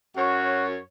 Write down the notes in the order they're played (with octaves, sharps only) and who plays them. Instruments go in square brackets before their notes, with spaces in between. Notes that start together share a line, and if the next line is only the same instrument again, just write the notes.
[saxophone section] F#2 C#5 [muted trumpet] F#4